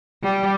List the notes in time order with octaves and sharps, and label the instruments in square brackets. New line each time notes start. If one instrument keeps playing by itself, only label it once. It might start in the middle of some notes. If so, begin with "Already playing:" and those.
[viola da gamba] G3